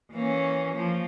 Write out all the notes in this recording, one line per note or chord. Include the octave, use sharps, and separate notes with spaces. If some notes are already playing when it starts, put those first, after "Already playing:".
E3 A#3 C#4
F3 A#3